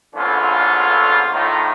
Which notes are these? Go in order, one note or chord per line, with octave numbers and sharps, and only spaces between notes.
A#1 E2 A2 D3 C#4 F4
A2 D#3 F4